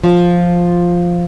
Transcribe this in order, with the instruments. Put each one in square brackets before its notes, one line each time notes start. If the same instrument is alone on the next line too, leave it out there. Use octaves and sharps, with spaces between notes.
[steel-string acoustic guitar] F3 F4